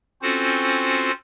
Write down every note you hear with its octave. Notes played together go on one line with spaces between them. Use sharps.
C4 C#4 F4 F#4 A4 C5